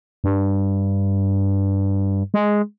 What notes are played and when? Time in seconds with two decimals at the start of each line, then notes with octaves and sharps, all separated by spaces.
0.24 G2
2.34 G#3